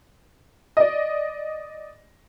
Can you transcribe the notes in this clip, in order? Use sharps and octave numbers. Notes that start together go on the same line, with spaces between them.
D5 D#5